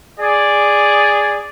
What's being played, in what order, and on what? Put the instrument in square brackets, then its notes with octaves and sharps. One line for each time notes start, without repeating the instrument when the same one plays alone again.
[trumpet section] G#4 D5